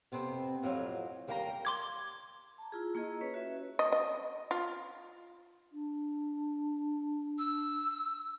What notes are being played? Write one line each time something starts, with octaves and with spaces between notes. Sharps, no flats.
F2 C3 B3 C4
F2 A2 F3 F#3
D#2 G3 A#3 G5 G#5 A#5
C6 D6 G#6
A5 A#5
E4 F4 G#4
A#3 E4 G#4 D#5
C#4 B4 C#5
F#4 B4 C#5 E5
D#5
D#5
F4
D4
E6